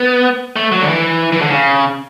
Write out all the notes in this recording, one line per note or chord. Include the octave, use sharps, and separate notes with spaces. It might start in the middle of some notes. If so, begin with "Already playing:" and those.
Already playing: B3
A3
F#3
D3
E3
E3
D3
C#3